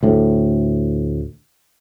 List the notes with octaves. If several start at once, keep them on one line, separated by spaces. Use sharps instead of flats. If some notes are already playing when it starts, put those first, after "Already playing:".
D2 A2